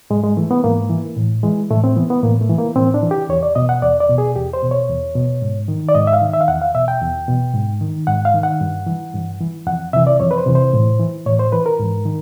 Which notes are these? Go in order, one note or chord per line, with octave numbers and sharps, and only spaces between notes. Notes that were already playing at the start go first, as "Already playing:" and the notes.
G#2 G#3
G#3
E3 A3
B3
G#2 A#3
E3
A2
E3 G#3
A2 A3
C4
E3 B3
B3
A2 A#3
A3
E3
A#3
A2 C4
D4
E3
G4
E2 C#5
D5
B2 D#5
F#5
E2 D5
D5
B2
G#4
E2 G4
C5
B2
C#5
E2
B2
G#2
D#3
D5
G#2 D#5
E5
F5
D#3
E5
F5
E2 F#5
F5
B2 E5
G5
E2
B2
G#2
D#3
G#2 F#5
F5
D#3
F#5
G2
E3
G2
E3
F2 F#5
C3 E3 E5
D5
F2 C#5
B4
C5
C3 E3
C5
A2
E3
A2 C#5
C5
E3 B4
A#4
G#2
D#3